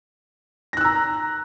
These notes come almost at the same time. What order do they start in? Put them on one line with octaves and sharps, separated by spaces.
A#6 F#6 E6 A#5